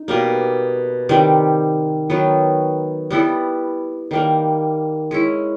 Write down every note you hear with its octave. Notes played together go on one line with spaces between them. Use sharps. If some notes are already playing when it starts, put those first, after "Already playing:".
Already playing: D#4
B2 G3 A#3
C3 D#3 G3
D#3 F#3 B3
G3 B3 E4 A4
D#3 G3 A#3
G#3 C#4 E4